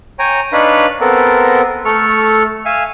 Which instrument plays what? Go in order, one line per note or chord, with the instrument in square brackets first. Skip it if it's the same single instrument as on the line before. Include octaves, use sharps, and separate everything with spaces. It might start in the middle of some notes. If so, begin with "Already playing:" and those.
[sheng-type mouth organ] C#5 G5 G#5 A#5
D4 D#4 B4 C#5 F5 B5
B3 C4 A4 A#4
A3 A4 C#6 F6
E5 F5 G#5